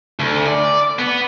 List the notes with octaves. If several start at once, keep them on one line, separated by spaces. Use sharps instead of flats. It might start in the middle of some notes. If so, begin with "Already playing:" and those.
D2
D5
B3